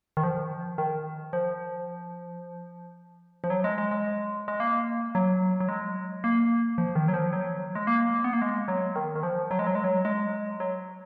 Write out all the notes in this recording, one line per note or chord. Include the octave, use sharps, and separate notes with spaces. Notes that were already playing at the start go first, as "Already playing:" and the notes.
D#3
F3
D#3
F3
F3
F#3
G#3
G#3
G#3
G#3
A#3
F#3
F#3
G#3
A#3
F3
D#3
F#3
F3
F#3
G#3
A#3
B3
A#3
G#3
F#3
D#3
D#3
F3
F#3
G#3
F#3
G#3
F#3
G#3
F#3